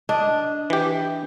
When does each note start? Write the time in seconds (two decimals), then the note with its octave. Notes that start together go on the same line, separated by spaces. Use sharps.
0.09 D4 D#5
0.70 E3 G4